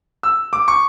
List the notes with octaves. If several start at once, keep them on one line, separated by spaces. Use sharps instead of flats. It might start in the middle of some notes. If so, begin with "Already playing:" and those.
E6
D6
C#6